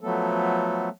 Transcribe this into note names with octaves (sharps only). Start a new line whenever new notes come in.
F3 F#3 A3 B3 A4